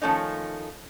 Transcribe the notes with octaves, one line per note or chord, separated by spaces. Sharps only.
D#3 F3 A3 C#4 D#4